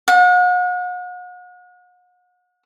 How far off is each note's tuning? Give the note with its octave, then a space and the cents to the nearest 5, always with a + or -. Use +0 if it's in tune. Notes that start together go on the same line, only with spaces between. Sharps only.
F#5 -40